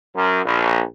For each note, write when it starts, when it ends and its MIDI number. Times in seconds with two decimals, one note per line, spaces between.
0.15 0.41 42
0.44 0.83 34